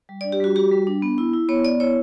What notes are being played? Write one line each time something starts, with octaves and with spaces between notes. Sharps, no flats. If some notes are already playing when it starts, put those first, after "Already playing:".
G3
D5
D4
G4
G3 F#4
F#4 G4
G3
D4
B3
E4
E4
B3 C#5
B3 D5
E4 C#5